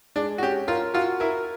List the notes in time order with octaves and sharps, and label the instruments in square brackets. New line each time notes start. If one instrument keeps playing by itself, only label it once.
[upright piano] G#3 [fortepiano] D4
[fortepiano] F#4
[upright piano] C#4 [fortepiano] G4
[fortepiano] F4 [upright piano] A#4
[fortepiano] F4 [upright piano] F#4
[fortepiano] E4 [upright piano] A#4